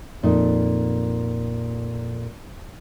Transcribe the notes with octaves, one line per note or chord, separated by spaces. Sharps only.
F2 A#2 D#4